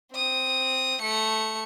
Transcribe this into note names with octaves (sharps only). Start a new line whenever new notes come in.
C4 D#6
A3 C#7